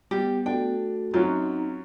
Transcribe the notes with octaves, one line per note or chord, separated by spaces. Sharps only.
G3 B3 G4
A3 D4 F#4 A4 G5
F#2 F#3 C4 C#4 D#4 F4